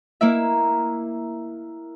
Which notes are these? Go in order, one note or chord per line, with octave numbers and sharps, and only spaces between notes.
A#3 E4 E5